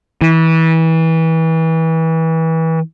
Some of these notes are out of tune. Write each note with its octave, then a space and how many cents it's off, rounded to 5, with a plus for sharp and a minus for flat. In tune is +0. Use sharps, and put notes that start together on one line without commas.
E3 -25